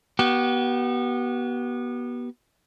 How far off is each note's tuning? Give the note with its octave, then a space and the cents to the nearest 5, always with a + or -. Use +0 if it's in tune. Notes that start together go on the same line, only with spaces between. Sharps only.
B3 -25 G4 -45